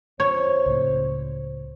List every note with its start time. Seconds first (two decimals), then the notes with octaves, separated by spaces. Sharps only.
0.20 F2 C5 C#5
0.66 C#2 A2